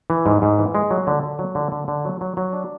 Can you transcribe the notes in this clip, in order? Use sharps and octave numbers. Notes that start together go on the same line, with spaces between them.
E3
G#2
G#2
E3
G#3
F#3
D3
D3
F#3
D3
D3
D3
F#3
F#3
F#3
D4